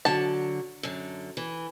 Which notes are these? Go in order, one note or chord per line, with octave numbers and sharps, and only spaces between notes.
D3 F#3 A5
F#2 D3
E3